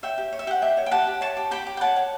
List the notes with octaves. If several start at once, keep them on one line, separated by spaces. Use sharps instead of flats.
C#5 E5 G5
G4
C#5
E5
G4 F#5
G4 E5 G5
C#5
G5
G4 F#5 A5
G4
C#5 A5 C#6
G4
G4 G5 B5
G4
G5
C#5 F#5 A5
C#5